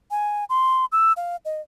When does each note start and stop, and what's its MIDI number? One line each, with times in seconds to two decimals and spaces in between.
0.11 0.45 80
0.49 0.85 84
0.92 1.13 88
1.17 1.36 77
1.45 1.61 75